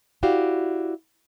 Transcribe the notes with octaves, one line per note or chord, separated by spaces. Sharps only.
E4 F#4 G4 D5 F5